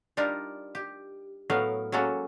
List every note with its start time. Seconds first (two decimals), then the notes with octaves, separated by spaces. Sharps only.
0.17 G3 D4 D#4 F4 A#4
0.75 G4
1.50 A2 F#3 A3 B3 A#4 F5
1.92 F#3 G#3 A#3 C#4 F#4 A4